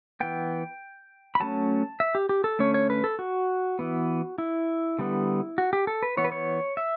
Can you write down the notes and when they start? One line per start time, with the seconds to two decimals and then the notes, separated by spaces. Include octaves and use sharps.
0.20 E3 B3 G5
1.35 B5
1.40 F#3 A3 C#4 A5
2.00 E5
2.15 G4
2.29 G4
2.44 A4
2.59 D3 A3 C#4 C#5
2.74 C#5
2.90 B4
3.04 A4
3.19 F#4
3.79 E3 B3
4.38 E4
4.99 D3 G3 B3
5.58 F#4
5.73 G4
5.87 A4
6.03 B4
6.17 E3 B3 C#5
6.24 B4
6.32 C#5
6.77 E5